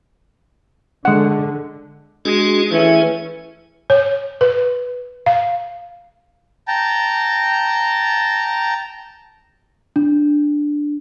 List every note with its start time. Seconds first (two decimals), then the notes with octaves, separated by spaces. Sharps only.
1.05 D3 G#3 F#5
2.25 G#3 D4 F#4 G#4
2.72 E3 A3 C#4 G#4
3.90 C#5
4.41 B4
5.26 F5
6.68 G5 A5 A#5
9.96 D4